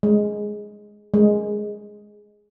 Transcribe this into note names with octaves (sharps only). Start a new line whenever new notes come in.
G#3
G#3